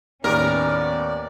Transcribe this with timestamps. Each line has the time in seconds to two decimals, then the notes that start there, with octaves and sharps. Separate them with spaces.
0.24 D#2 A2 B3 C#4 A#4 D5